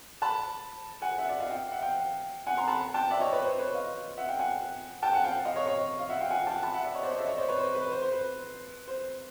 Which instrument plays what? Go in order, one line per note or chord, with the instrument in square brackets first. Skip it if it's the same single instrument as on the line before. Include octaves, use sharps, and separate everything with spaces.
[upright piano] A5 B5
F#5 G#5
E5 F#5
D5 E5
D#5 F5
F5 G5
E5 F#5
F5 G5
F#5 G#5
A#5 C6
A5 B5
G5 A5
D5 E5
C#5 D#5
B4 C#5
C5
B4 C#5
D#5 F5
E5 F#5
F5 G5
F#5 G#5
G5 A5
F#5 G#5
F5 G5
D#5 F5
C#5 D#5
C#5 D#5
D#5 F5
E5 F#5
F5 G5
F#5 G#5
G5 A5
A5 B5
E5 F#5
D5 E5
C#5 D#5
C5 D5
C#5 D#5
D5 E5
C#5 D#5
C5 D5
B4 C#5
C5
B4
C5
C5
B4
C5